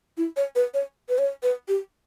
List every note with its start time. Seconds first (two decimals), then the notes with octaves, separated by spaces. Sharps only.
0.17 E4
0.37 C#5
0.55 B4
0.74 C#5
1.09 B4
1.18 C#5
1.43 B4
1.68 G4